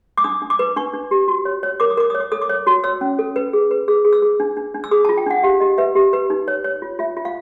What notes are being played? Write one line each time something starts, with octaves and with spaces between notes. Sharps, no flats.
D6
D4 D#6
D4
D6
B4
D4 C#6
D4
G4
F#4
C#5
C#5
A#4 D6
D#6
A#4 D6
C#5 D#6
D6
A4 D#6
D6
C#5
F#4
C#5 E6
C#4
A4
B4
G#4
B4
G#4 E6
G#4
E6
G#4
D4
D4
D4
E6
G#4 D#6
F4 A5
G5
D4 F#5
G4 F5
G4 D#5
B4 E5
G4
B4
D#4
C#5
C#5
F4
F4 E5
F4
F5